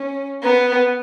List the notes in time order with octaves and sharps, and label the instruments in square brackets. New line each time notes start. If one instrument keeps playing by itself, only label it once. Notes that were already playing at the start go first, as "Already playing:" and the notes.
Already playing: [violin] C#4
B3